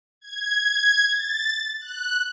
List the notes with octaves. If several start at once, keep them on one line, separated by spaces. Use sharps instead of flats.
G#6
A6
F#6